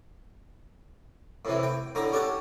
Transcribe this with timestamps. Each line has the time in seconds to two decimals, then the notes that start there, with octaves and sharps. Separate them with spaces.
1.45 A2 C3 E3
1.63 G5
1.95 A2 D3 A#5 D6
2.12 C#4 G4 A4 F#5 A5